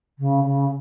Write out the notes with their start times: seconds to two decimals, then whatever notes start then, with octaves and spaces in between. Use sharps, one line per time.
0.18 C#3
0.44 C#3